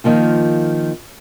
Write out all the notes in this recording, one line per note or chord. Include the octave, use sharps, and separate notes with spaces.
D#3 F3 A#3 F4